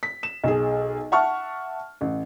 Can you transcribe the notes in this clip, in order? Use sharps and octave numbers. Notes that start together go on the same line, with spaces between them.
B6
E7
B1 G#4
E5 F#5 A5 C#6 F6
A1